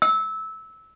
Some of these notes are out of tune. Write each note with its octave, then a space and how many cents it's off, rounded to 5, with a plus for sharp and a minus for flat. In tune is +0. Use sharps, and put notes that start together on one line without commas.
E6 -20